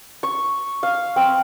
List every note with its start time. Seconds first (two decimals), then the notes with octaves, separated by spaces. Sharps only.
0.23 C#6
0.83 F5
1.16 C4